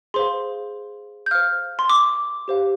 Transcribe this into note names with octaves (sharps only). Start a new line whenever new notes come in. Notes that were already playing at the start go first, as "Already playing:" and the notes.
G#4 C5 F5 C6
G6
C5 F5 F6
C6
D6
G4 C5 F5